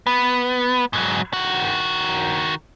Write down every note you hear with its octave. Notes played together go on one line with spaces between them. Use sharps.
B3
G#2 F#3
D#3 F#4